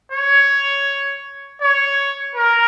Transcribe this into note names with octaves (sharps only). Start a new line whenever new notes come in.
C#5
C#5
A#4